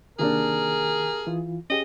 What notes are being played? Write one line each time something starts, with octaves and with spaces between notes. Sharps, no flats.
C3 D#3 A#3 D4 G#4 A#4
E3 F4
C#4 G4 G#4 D#5